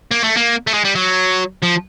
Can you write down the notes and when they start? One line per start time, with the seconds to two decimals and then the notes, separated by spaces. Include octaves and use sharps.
0.11 A#3
0.24 A3
0.37 A#3
0.67 A3
0.74 G#3
0.84 G3
0.95 F#3
1.63 F3